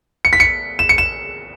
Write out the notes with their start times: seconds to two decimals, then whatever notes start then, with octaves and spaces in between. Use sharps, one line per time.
0.25 C#7
0.33 B6
0.40 C#7
0.79 E7
0.89 C#7
0.98 E7